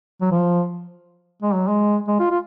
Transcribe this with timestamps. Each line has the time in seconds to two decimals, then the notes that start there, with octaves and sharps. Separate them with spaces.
0.21 F#3
0.31 F3
1.42 G#3
1.54 F#3
1.68 G#3
2.08 G#3
2.20 F4
2.31 F4